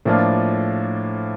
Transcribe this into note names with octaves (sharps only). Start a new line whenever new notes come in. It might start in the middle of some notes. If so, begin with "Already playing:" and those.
A2 F3 A#3 D4 F4